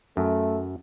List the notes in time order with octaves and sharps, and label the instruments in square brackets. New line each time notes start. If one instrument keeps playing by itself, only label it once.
[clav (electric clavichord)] F#2 [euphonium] A3